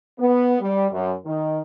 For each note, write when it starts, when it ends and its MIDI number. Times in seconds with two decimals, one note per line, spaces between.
0.20 0.56 59
0.61 0.87 55
0.91 1.13 42
1.26 1.59 51